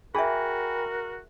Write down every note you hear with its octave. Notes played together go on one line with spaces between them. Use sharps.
F#4 G#4 A#4 E5 G5 G#5 B5